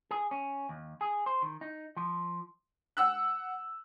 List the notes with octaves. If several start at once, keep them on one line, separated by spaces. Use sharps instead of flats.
G#4
C#4
D#2
G#4
C5
D#3
D#4
F3
F#5 E6 F#6